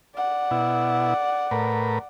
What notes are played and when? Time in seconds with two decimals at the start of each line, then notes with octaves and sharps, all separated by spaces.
0.15 D5 F#5
0.51 B2 E4
1.51 A2 A#4 B4